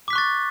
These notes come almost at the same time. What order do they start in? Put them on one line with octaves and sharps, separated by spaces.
D6 B6 F#6 C#6 A6